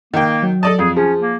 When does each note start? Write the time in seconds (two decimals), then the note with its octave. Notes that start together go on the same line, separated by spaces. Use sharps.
0.14 D#3 A#3 G5
0.42 F#3
0.63 A4 D5 D#5 A5
0.79 F2 G#4
0.96 F3 C#4 G#4
1.21 A#3